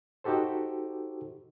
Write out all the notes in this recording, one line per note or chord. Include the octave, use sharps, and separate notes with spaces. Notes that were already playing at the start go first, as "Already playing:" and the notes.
D#4 F#4 G4 A4 C5